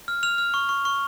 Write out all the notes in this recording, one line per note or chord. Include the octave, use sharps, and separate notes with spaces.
F6
F6 F7
F6
C#6
C#6
C#6